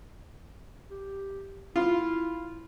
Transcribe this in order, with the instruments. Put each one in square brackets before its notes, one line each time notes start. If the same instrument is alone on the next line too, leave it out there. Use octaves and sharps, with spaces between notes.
[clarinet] G4
[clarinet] E4 [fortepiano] F4